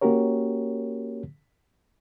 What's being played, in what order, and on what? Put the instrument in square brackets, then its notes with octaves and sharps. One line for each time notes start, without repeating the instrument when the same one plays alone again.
[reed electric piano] A#3 C#4 F#4 G4 A#4 C#5